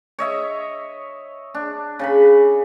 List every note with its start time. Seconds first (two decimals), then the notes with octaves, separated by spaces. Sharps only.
0.19 C#5 D#5 E5
1.54 D4
1.99 C#3 G#5 B5